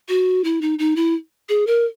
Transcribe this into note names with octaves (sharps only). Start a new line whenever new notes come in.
F#4
E4
D#4
D#4
E4
G#4
A#4